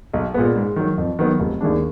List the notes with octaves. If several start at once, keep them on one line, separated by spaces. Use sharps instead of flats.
B1
A#2 G#3 B3
G#2
D#3 F#3
F2
D#3 F#3 B3
F1
D#2 D#3 G#3 D4